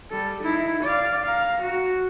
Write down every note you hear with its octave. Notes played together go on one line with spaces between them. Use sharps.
G3 A4
D#4 E4
D5 F5
F5 A#5
F#4